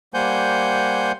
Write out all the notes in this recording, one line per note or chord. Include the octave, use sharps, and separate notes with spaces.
G3 A#3 C5 F#5 G#5 G6